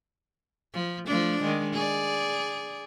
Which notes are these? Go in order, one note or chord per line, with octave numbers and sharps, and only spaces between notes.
F3
F3 A3 D4
D#3 G#3
G#4 D5